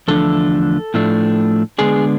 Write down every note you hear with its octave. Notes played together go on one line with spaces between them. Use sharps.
E2 D3 F3 A3 D4 A4
A2 F3 A3 D4
D3 G#3 B3 D4 G#4